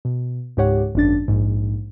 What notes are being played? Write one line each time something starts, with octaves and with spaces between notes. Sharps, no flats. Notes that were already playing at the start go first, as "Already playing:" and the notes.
B2
C#2 G#2 G4 C#5 F#5
G#1 F#2 D4 A6
A#1 G#2